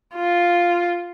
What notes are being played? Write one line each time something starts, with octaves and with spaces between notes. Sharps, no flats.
F4